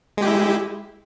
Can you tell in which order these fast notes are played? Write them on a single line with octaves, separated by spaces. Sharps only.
G#3 G4 E4